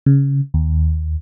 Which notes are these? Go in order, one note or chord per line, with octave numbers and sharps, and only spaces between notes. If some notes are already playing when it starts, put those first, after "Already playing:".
C#3
D#2